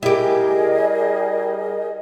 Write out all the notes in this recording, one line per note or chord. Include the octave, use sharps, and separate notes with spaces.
G3 E4 G4 G#4 A#4 D#5